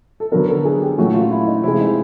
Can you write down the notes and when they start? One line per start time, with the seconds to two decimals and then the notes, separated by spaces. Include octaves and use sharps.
0.20 A4
0.32 D3 F#3 B3 A#4
0.49 A4
0.65 G#4
0.82 G4
0.98 A#2 F#3 A3 C#4 F#4
1.14 F4
1.31 E4
1.47 D#4
1.63 C3 E3 G#3 E4
1.80 D#4